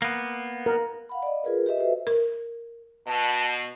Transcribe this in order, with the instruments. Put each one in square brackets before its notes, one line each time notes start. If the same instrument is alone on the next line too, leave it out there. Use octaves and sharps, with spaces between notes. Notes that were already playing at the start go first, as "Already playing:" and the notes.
[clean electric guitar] A#3 B3
[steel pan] A#4
[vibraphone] F5 F#5 B5
D5 D#5
F4 G#4 A#4 B4
G4 B4 D#5 E5
F#4 A4 B4 C5 E5
[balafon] A#4
[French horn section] B2 [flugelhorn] A5